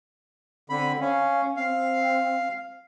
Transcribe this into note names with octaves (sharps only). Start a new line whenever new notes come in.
D3 C4 B5
C#4 F5
C4 F5